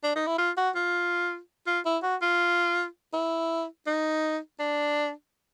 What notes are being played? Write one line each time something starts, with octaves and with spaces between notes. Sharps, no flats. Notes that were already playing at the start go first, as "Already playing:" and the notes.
D4
D#4
E4
F4
F#4
F4
F4
E4
F#4
F4
E4
D#4
D4